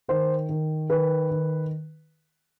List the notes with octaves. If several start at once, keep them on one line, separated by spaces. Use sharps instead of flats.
D#3 C5
D#3
D#3 B4
D#3